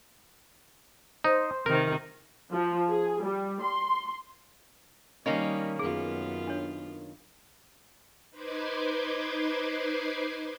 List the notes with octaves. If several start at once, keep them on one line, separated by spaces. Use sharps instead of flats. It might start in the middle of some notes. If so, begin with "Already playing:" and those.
D#4 C5
C3 D#3 A#4
F3
G#4
G3
C6
D#3 G3 A#3 C#4 D#4 D#5
F#2 B3 F4 G#4
D4 C#5
D#4 B4 C5 C6 D6 G#6